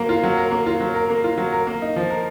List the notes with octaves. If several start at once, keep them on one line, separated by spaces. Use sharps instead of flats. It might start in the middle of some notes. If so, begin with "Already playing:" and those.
Already playing: F#3 A#3 A#4
F4
F#3
A#4
A#3
F4
F#3
A#4
A#3
F4
F#3
A#4
A#3
D#4
F3
A#4